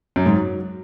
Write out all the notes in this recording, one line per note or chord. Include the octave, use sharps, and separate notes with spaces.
F#2
G#2
F#3